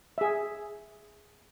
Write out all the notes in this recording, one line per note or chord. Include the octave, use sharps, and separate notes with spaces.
G#4 E5